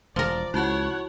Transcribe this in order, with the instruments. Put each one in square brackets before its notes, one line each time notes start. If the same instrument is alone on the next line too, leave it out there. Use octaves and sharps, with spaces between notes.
[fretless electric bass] E1 [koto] F3 A#4 [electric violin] D5
[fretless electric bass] C#2 [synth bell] E4 F#4 A5 [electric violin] C#5 F#5